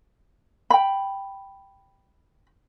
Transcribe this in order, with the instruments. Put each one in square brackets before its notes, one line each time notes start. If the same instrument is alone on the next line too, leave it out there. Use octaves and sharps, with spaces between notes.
[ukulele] G5 B5